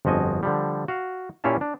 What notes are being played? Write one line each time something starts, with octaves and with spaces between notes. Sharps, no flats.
G1 F2 F3 F#4 D#5 G#5
D3 F3 G3
F#4 F5
A#2 C#4 E4 G4 F5 A5
D4